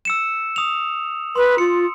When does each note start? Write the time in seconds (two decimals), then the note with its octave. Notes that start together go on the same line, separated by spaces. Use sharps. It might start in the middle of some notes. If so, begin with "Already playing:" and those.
0.05 E6 C#7 E7
0.56 D#6 F7
1.36 B4 C6
1.58 F4 C#7